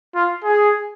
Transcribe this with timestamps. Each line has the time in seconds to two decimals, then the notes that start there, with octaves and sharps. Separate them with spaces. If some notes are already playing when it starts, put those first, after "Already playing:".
0.15 F4
0.44 G#4